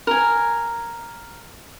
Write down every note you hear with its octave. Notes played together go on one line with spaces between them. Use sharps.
A#4 G#5